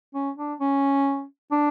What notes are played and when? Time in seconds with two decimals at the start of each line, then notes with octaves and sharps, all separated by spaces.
0.14 C#4
0.38 D4
0.60 C#4
1.52 D4